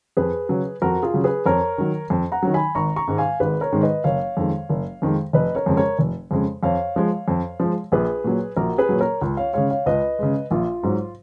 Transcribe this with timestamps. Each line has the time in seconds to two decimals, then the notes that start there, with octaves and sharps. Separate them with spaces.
0.17 F2 G#4 B4
0.49 C#3 F#3
0.82 F2 F#4 A#4
1.03 F4 G#4
1.14 C#3 F#3
1.24 G#4 B4
1.46 F2 A#4 C#5
1.78 D#3 F#3
2.10 F2
2.32 F#5 A#5
2.43 D#3 F#3
2.54 G#5 B5
2.75 G#1 A#5 C#6
2.96 A#5 C#6
3.08 G#2 D#3 G#3
3.18 F5 G#5
3.40 G#1 G#4 B4
3.61 A#4 C#5
3.73 G#2 D#3 G#3
3.83 B4 D#5
4.04 F#1 C#5 F5
4.37 F2 D#3 G#3
4.69 F#1
5.02 F2 D#3 G#3
5.33 F1 B4 D#5
5.55 A#4 C#5
5.66 F2 C#3 G#3
5.77 A#4 C#5
5.99 F1
6.31 F2 C#3 G#3
6.63 F2 C#5 F5
6.96 F3 G#3
7.28 F2
7.60 F3 G#3
7.92 A#1 G#4 B4
8.24 A#2 F#3
8.56 A#1 F#4 A#4
8.78 G#4 B4
8.89 A#2 F#3
9.00 A#4 C#5
9.21 C#2
9.37 C#5 F5
9.53 C#3 G#3 C#5 F5
9.70 C#5 F5
9.86 C#2 B4 D#5
10.19 C#3 G#3
10.51 A#1 F4
10.83 G#2 F#3